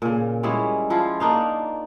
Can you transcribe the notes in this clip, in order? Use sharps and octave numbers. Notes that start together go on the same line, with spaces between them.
A#2 C#3
G3 G#3 C#4 E4
F3 E4 F4
A#3 D4 D#4 F5